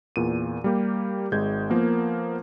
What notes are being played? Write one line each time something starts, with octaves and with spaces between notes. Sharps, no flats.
E2 A#2 D#7
G3 A#3 G4
G#1 G#3 G6 G#6
F3 A#3 B3 A#4